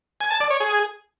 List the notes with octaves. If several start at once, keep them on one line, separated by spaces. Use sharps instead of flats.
G#5
A5
D5
C#5
G#4